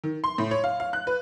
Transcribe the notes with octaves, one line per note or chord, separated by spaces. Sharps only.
D#3
C6
A2
C#5
F5
F5
F#6
B4